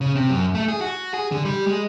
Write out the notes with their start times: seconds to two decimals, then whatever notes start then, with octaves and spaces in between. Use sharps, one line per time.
0.01 C#3
0.15 C3
0.30 F#2
0.55 A3
0.68 G#4
0.81 F#4
1.14 G#4
1.32 D3
1.45 G3
1.67 G#3